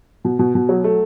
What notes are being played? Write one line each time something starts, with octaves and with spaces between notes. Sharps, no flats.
B2
B2
B2
F#3
A3